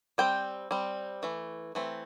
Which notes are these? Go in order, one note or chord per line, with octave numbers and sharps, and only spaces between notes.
G3 C4 G5
G3 C4
E3 A3
E3 A3 C4